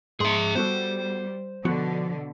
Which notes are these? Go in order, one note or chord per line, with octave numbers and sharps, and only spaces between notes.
G#2 G#4 E5 C6
G3 B3 F#4 A4 C5
B2 D3 F3 B3 F#4